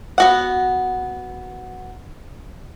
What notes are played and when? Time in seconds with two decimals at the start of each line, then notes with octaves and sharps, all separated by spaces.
0.18 B3 F#4 F#5